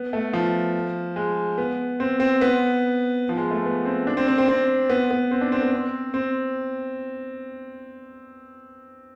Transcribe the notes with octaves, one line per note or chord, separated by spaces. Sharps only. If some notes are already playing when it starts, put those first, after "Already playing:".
Already playing: B3
A3
F3
G#3
B3
C4
C4
B3
F3
G#3
A3
B3
C4
D4
C4
C4
C4
C4
B3
B3
C4
D4
C4
B3
C4
C4